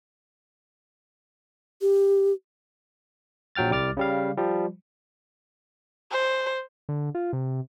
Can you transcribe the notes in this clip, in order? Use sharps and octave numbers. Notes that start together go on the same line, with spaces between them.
G4
A#1 F#3 G5 F6 A6
C2 G3 D6 F6 A6
C#3 G3 F5
F3 G3
C5
D3
F4
C3